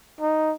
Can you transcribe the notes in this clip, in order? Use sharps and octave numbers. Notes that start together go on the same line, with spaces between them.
D#4